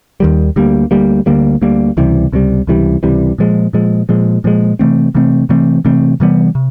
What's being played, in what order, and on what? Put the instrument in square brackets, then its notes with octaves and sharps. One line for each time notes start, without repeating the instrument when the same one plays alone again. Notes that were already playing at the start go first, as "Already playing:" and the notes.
[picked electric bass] D#2 D#3 G3
D2 D3 G3 A#3
D2 D3 G3 A#3
D2 D3 G3 A#3
D2 D3 G3 A#3
C#2 C3 E3 G3
C#2 C3 E3 G3
C#2 C3 E3 G3
C#2 C3 E3 G3
A#2 F3 G#3
A#2 F3 G#3
A#2 F3 G#3
A#2 F3 G#3
C3 E3 A3 C4
C3 E3 A3 C4
C3 E3 A3 C4
C3 E3 A3 C4
C3 E3 G3 B3
C3